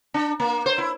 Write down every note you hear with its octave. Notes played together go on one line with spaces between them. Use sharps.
D4
A#3
C5
E4